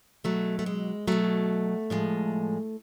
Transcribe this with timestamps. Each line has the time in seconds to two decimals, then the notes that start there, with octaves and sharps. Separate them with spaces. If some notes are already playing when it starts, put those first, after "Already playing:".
0.24 B2 F#3 A3
0.59 A3
0.66 G#3
1.07 B2 F#3 A3
1.90 A2 F3 G#3